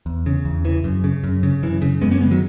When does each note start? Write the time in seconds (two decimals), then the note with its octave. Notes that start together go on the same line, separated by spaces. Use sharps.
0.06 E2
0.26 C#3
0.45 E2
0.65 C#3 E3
0.84 F#2
1.04 C#3
1.24 F#2
1.43 C#3
1.63 F#2 E3
1.82 C#3
2.01 F#2 G#3 B3
2.11 A#3 C#4
2.21 C#3 G#3 B3
2.31 D#3 F#3